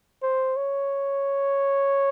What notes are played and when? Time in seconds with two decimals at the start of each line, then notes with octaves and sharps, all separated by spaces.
0.22 C5
0.56 C#5